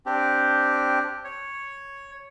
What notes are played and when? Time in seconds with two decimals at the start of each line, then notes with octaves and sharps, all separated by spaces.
0.06 C4 D4 G4
1.25 C#5